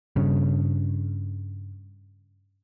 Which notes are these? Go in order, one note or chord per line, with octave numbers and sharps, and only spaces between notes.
G2 C#3